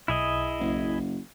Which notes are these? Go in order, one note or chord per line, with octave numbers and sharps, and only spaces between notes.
B1 E4 G#4 D#5
F#1